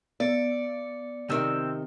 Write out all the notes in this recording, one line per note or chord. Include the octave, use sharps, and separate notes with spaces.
B3 D5 C#7
C3 D#3 C4 E6